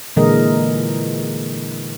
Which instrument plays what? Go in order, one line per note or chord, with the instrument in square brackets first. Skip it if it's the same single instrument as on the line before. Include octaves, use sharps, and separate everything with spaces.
[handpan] A#2 D3 E3 G#3 A#4 D#5